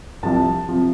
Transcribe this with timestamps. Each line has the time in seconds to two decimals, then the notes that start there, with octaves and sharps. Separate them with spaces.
0.23 C2 C3 F3 A5
0.69 C3 F3